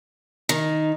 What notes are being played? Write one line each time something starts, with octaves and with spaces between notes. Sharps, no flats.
D#3